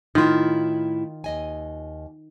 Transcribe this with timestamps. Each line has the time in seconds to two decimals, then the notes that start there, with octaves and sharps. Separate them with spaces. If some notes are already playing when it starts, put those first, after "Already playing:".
0.15 A2 D#3 E4 F4
1.24 D#2 D#5 G#5